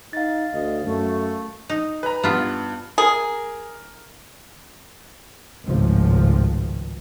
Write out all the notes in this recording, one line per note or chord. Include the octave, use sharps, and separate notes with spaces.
D#4 F5 A6
D2 D#5
F#2 A3
D#4
B4 A#5
G2 B3 F4
G#4 A#4
G#1 C#2 A2 F3